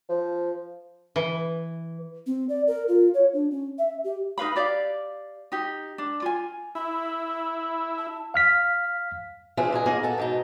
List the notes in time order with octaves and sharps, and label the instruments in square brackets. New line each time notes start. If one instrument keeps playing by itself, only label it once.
[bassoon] F3
[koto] E3
[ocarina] C4
D5
A#4
F4
C#5
D4
C#4
E5
G4
[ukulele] D#4 B4 F5 B5
G4 D5 F5
D#4 G4
D4
F4 G#5
[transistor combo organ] E4 [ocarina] B5
[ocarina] A5
[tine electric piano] F5 F6 B6
[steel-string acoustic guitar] F3 D4 E4 F4 G#4 B4
A#2 G#3 D#4 G#4
G2 A#3 B3 F4 G#4 D#5
B3 A4
G#2 B2 D#4